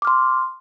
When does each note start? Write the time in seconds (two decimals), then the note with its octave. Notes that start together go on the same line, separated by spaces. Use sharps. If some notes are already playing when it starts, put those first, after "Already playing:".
0.02 D6
0.05 F6
0.07 C6